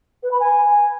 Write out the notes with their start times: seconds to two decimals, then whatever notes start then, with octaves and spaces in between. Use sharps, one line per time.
0.23 B4
0.31 B5
0.40 G#5